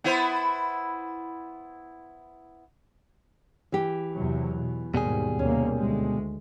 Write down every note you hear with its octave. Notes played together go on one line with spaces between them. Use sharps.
B3 E4 C5
E3 G4
E2 C3 F#3
B2
D#2 G#2 B2 G3 G#4
D#2 C3 A#3 C#4
D2 G#3